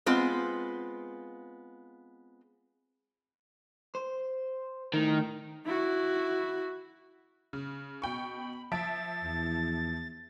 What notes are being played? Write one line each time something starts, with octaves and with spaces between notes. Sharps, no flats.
G#3 B3 C4 F4
C5
A2 D#3 A#4
E4 F#4
C#3
B2 G5 B5 C#6
F3 E5 A6 D7
E2